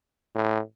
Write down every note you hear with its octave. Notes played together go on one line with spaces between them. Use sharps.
A2